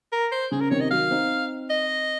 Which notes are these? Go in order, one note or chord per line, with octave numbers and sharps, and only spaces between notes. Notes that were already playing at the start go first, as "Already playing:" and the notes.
A#4
C5
C#3 G#4
A#4
C3 D#3 C#5
D#5
D#3 F#3 F5
C4 D#4
D#5